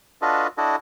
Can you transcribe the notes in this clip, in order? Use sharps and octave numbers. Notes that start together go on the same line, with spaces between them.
D4 F4 F#4 A4 B4 D#5
D4 E4 F#4 A4 D#5